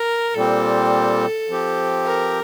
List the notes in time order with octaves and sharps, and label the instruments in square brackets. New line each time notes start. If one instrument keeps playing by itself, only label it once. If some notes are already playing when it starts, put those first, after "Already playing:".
Already playing: [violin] A#4
[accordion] A#2 G3 C4 [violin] A4
[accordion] F3 C4 G4
[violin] A#4